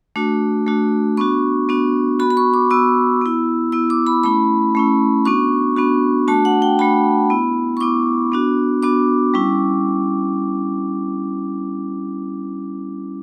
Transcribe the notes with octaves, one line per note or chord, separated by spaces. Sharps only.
A3 D4 F#4
A3 D4 F#4
B3 D4 F#4 C#6
B3 D4 F#4
B3 F#4 B5
B5
C#6
D6
B3 F#4 E6
B3 E4
B3 E4 E6
D6
B5
A3 C#4 E4 B5
A3 C#4 E4
B3 D4 F#4 C#6
B3 D4 F#4
A3 D4 F#4 A5
F#5
G5
A3 D4 F#4 B5
B3 E4
C#6
B3 E4 D6
B3 D4 F#4
B3 D4 F#4 D6
G3 C#4 E4